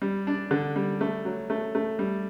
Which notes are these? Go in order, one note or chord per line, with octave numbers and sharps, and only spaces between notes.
G3
D4
D3
G3
A3
F#3
A3
A3
G3